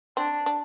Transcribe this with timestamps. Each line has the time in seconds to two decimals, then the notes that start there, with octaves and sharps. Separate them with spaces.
0.17 C4 D4
0.46 D4